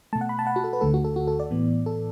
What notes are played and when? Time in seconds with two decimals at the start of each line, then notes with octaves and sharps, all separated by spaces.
0.13 B2 A3 A5
0.21 F#5
0.29 B5
0.39 A5
0.47 F#5
0.56 F#4
0.64 A4
0.73 B4
0.81 D2 D3 A3 A4
0.94 F#4
1.04 A4
1.16 F#4
1.28 A4
1.40 D5
1.51 A2 E3 B3
1.86 A4